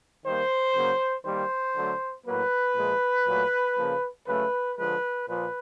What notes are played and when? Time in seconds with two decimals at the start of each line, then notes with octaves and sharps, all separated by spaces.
0.25 D#3 G3 A#3 C5
0.74 C#3 F#3 A#3
1.24 D#3 G3 A#3 C5
1.75 D3 F#3 A3
2.26 A2 F#3 A#3 B4
2.75 A#2 F3 G#3
3.26 A#2 F#3 A3
3.77 C#3 F3 A#3
4.27 C#3 F#3 A3 B4
4.78 D3 F3 G#3 B4
5.28 A#2 F3 B4